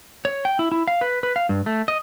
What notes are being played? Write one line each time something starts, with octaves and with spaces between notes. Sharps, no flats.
C#5
G5
E4
E4
F5
B4
B4
F5
G2
A3
D#5